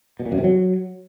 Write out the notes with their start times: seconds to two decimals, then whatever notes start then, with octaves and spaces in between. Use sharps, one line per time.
0.19 B2
0.26 A#2
0.32 F#2
0.38 C3
0.44 F#3